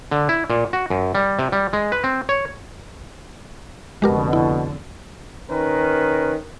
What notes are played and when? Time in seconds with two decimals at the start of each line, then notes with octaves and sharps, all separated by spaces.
0.11 D3
0.29 E4
0.50 A#2
0.73 F#4
0.90 F#2
1.15 G3
1.39 C3
1.52 G3
1.73 G#3
1.92 B4
2.04 C4
2.29 C#5
4.02 F1 B2 D3 G#3 G4 A#4
4.33 E4
5.50 D#3 C#4 A#4 B4